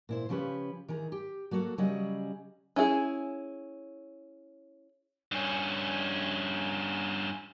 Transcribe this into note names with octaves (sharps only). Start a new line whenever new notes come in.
A#2 E4 C5
C#3 F3 C#4 G4 B4
D#3 E3 G#4 A#5
G4
F#3 A#3 F#4 A4
C#3 F#3 G3 C#4 G#4 D#5
C#4 E4 F4 G#4
G2 C#4